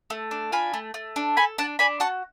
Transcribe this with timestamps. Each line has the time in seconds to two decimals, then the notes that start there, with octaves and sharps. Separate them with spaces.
0.10 A3
0.31 D4
0.52 F4 G#5 B5
0.73 A3
0.94 A3
1.16 D4
1.37 A4 G#5 B5
1.58 D4 F#5 A5
1.79 D4 G#5 B5
2.00 F#4 A5 C#6